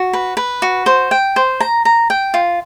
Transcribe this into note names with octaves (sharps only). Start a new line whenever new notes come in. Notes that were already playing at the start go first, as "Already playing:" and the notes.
Already playing: F#4
B4
B4
F#4
C5
G5
C5
A#5
A#5
G5
F4